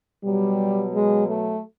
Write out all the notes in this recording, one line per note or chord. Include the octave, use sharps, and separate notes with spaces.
B2 F#3 G3
G#3
A3